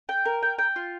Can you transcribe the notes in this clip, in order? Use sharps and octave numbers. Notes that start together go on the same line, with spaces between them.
G5
A#4
G5
G5
F4